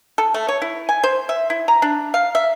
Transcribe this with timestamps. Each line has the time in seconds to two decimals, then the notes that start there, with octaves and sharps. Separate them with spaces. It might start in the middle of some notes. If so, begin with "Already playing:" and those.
0.18 A4
0.34 A3
0.48 C#5
0.62 E4
0.89 G#5
1.04 C5
1.29 E5
1.50 E4
1.68 A#5
1.82 D4
2.14 F5
2.35 E5